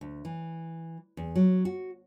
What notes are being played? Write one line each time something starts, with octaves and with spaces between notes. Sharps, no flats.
D2
E3
E2
F#3
F#4